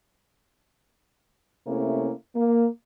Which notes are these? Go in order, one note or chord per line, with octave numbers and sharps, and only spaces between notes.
C3 A3 A#3 C#4 E4
A#3